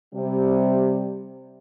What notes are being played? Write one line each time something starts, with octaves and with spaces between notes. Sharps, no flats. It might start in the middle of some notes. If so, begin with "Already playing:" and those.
C3 G3